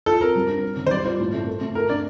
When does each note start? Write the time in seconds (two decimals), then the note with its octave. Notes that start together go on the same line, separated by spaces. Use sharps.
0.06 F4 A4
0.21 C4 A#4
0.35 G3
0.49 D4
0.62 C4
0.77 D#3
0.87 C5
0.91 G3 D5
1.05 F4 C5
1.20 A2
1.34 A3
1.47 A4
1.61 A3
1.75 A4 A#4
1.90 D4 D5